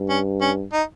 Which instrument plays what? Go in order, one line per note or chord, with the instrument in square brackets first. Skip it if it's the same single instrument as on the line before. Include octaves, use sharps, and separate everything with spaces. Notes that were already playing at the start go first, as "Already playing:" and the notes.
Already playing: [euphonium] G2
[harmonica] C#4
C#4
D#4